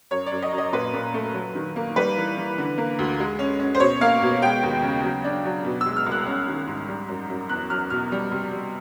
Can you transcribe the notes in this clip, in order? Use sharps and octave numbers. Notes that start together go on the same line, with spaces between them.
F#2 C#5
D5
F#2
D#5
F#2
D#5
A#2 B4
A#2
A3
F#3
D#3
A#3
G3 B4
E3
E3
D3
A#3
D2
G#3
C#4
C#4
C5
B2 C#5
A#3 F5
B2
G#3 G5
D#2
C#3
F#3
D4
F#3
B2
E6
G#3
F6
C2
F#6
C#4
D#3
G#2
G3
F#2
F#2
E2 F#6
F#3 F6
B2 F6
G3
C3
G3